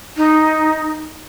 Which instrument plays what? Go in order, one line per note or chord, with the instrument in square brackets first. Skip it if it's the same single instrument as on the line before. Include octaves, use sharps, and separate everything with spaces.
[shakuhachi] D#4